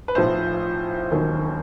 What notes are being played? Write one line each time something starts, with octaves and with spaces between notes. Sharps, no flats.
B4
B1 A2 F3 C5
E1 D#2 D#3 F#3